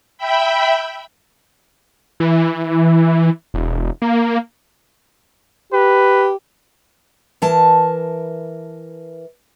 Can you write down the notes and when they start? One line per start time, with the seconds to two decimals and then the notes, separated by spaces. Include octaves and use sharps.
0.18 E5 G5 B5
2.20 E3
3.54 E1
4.02 A#3
5.73 G4 B4
7.42 E3 A#4 A5